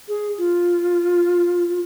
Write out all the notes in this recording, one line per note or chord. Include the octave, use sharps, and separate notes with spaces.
G#4
F4